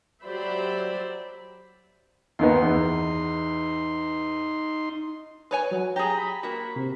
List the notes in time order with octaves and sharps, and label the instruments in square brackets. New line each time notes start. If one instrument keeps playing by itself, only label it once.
[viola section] F#3 G4 C5 D5 E5 B5
[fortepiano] D#2 D#3 B3 [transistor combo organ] D#4 C6
[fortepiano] E2
[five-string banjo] B4 C#5 G#5
[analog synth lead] F#3
[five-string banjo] G4 G#4 [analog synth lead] A#5
[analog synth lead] B5
[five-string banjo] A#3 F#4
[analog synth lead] C3